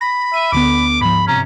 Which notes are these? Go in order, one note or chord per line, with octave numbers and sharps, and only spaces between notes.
B5 A#6
E5 D#7
D2 D3 B3 D6
G#2 F3 B5
G2 C3 C#4 A#5